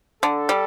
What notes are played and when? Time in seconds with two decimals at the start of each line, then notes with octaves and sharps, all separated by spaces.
0.23 D3 A4
0.49 G3